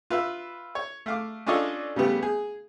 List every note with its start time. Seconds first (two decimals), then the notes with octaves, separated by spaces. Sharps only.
0.10 F4 B4 E5
0.75 C#5
1.06 A3 F5 D6
1.46 C#4 D4 F4 A4 C#5 D#5
1.96 C#3 G3 A3 B3 G4
2.23 G#4